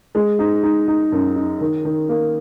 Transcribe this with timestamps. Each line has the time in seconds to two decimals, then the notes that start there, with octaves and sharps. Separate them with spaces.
0.15 G#3
0.39 D#4
0.63 D#4
0.88 D#4
1.12 F#2
1.36 D#4
1.61 D#3
1.85 D#3
2.09 A#3